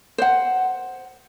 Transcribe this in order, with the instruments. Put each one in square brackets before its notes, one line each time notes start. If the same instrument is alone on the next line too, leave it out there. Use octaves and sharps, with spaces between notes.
[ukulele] C5 F#5